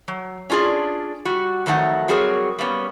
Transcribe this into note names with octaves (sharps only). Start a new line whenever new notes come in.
F#3
C#4 D4 F4 G#4 D5
G3 F#4
F2 D#3 F#3 A3 D#4 F#5
F#3 G3 C4 G#4 A#4 C#5
G3 A#3 B3 C#4